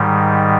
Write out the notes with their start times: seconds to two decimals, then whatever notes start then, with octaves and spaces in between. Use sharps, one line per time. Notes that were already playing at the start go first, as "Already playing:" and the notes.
Already playing: G#2 D#3 G3